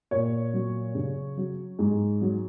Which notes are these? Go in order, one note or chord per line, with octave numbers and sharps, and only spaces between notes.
A#2 C#5
F#3
C#3
F#3
G#2
F#3